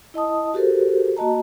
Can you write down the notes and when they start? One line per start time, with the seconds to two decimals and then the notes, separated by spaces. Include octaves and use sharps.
0.14 E4 D#5 A5 D#6
0.54 F#4 G4 A4 A#4 C5
1.17 A#3 F#4 D#5 A5 A#5